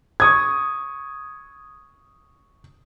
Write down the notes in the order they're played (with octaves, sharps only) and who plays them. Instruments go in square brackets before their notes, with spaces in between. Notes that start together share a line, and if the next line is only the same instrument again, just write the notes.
[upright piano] C#6 D#6 G#6